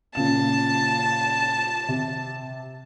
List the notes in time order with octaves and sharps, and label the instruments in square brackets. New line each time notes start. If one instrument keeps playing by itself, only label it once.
[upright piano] A#2 C#3 E7 [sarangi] A5
[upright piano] C3